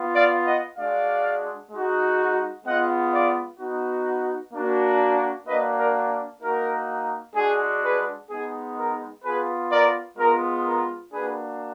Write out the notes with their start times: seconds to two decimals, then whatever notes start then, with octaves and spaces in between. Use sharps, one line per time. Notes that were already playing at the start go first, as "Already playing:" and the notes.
Already playing: B3 F4
0.14 D5 F5
0.46 D#5 F#5
0.77 G#3 D4 F#4 D5 F5
1.71 G#3 D#4 F#4
2.65 G#3 B3 F4 D#5 F#5
3.13 D5 F5
3.59 B3 D#4 F#4
4.54 A#3 D4 F#4
5.47 A#3 D4 F#4 B4 D#5
5.79 A#4 D5
6.42 A#3 D#4 F#4 A#4
7.35 G#3 D4 F#4 G#4
7.83 G#4 B4
8.30 G#3 B3 D#4 G#4
8.77 A#4
9.23 B3 F4 G#4 B4
9.71 A#4 D5
10.18 G#3 B3 F4 A#4
10.65 A#4
11.12 A#3 D4 F#4 G#4 B4